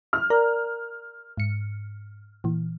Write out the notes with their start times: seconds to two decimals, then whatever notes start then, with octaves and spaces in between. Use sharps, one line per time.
0.13 F6
0.30 A#4 D5 A#5
1.37 G#2 C#7
2.44 A#2 E3